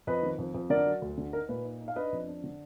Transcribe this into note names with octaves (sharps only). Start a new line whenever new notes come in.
F2 B4 D#5
D#3
F2
F2
D3 A#4 D5
F#3
D2
D3
D#4 A#4
A#2 B4
D#4
D#4
F5
D4 B4 D#5
F2
D4
D3